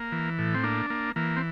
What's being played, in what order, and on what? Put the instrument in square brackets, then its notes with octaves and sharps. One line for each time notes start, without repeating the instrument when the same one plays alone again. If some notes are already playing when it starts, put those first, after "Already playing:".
Already playing: [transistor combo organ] A#3
E3
A2
C4
A#3 D4
A#3
E3 A#3
C4